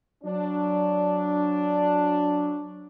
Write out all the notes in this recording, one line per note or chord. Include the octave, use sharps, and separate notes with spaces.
F#3 D4